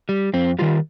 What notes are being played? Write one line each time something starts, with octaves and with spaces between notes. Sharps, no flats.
G3
F2 C4
D#3 G3 F4